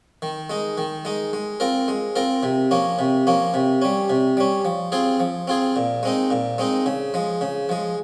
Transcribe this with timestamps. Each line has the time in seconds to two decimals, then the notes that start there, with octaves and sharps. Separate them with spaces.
0.22 D#3
0.50 G#3 D#4
0.78 D#3
1.05 G#3 D#4
1.33 G#3
1.60 C4 F4 A#4
1.88 G#3
2.16 C4 F4 A#4
2.43 C3
2.71 F3 A#3 C#4
2.99 C3
3.27 F3 A#3 C#4
3.54 C3
3.82 G3 C#4
4.10 C3
4.37 G3 C#4
4.65 F3
4.92 C4 F4 G#4
5.20 F3
5.48 C4 F4 G#4
5.76 A#2
6.03 G#3 C4 D#4
6.31 A#2
6.58 G#3 C4 D#4
6.86 C#3
7.14 F3 G#3
7.41 C#3
7.69 F3 G#3